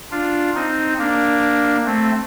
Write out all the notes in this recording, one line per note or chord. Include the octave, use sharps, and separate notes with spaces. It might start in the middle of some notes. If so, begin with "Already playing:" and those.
D4 F4
C4 D#4
A#3 D4
A3 C4